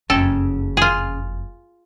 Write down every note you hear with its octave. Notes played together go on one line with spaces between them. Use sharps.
F#1 F2 C#3 A4 G5
F4 G#4